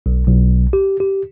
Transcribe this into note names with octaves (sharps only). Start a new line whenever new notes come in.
B1
B1
G4
G4